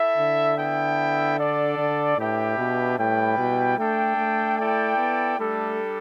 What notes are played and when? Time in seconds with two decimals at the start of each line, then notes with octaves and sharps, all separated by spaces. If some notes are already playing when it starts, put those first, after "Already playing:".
Already playing: E4 A4 E5
0.17 D3
0.57 B3 E4 A4 E5 G5
1.37 D4 A4 D5
1.77 D3
2.17 A2 D4 G4 B4 E5 G5
2.58 B2
2.98 A2 G3 E4 B4 G5
3.38 B2
3.78 A3 D4 A4 G5
4.17 A3
4.57 E4 A4 D5 G5
4.97 B3
5.38 G3 A3 D4 A4